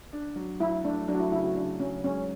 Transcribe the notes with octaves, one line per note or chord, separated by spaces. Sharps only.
D4
F#3
F#3 E4
A3 D4
F#3 D4
F#4
E4
C#3 E4
F#4
C#3 D4
F#3 C#4
G#2 C#4